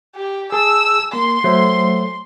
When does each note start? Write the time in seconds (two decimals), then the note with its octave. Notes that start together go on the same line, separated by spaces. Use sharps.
0.15 G4
0.52 G#4 A5 E6
1.13 A#3 C6
1.44 F#3 A3 C5